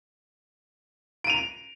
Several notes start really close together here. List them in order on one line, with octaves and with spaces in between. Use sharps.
D7 D#7 F7